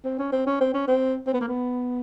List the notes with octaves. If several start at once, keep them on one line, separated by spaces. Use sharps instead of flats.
C4
C#4
C4
C#4
C4
C#4
C4
C4
B3
A#3
B3